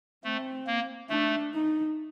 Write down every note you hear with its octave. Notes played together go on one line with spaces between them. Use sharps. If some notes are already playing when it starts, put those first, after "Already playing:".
A3 C4
A#3
A3 D4
D#4